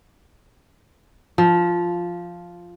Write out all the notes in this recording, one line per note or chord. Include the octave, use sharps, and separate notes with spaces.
F3